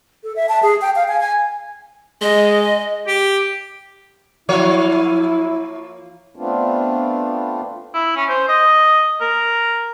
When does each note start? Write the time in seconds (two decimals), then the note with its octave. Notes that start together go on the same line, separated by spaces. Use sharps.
0.24 A4
0.36 E5
0.49 A5
0.63 G#4
0.82 G5
0.96 F5
1.08 G#5
1.20 G#5
2.22 G#3 D#5
3.07 G4
4.49 F3 A#3 E4 C#5
6.36 A3 B3 C4 D4 F4
7.94 E4
8.16 C#4
8.29 C5
8.49 D#5
9.21 A#4